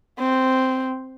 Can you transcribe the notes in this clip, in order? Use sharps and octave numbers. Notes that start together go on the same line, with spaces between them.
C4